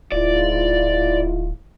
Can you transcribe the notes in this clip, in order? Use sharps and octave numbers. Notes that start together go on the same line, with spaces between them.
D1 G#2 E4 F4 D5